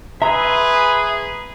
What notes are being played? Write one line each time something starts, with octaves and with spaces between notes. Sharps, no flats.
G#4 B4 E5 A#5 C6 E6